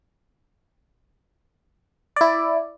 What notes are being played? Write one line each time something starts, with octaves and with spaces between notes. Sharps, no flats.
E4 D5